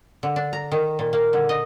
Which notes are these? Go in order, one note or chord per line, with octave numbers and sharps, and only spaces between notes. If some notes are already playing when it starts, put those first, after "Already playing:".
D3
D4
A#5
D#3
A#2
A#3
D3
D#5